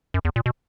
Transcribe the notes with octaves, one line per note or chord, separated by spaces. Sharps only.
F#2
E2
A#2
B2